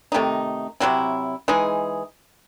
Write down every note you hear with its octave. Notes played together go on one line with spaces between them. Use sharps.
C3 D#3 A3 D#4
C3 F#3 C4 E4
E3 G#3 D#4 G#4